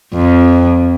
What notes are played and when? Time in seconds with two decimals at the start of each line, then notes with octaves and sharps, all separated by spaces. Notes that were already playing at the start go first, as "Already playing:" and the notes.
0.14 F2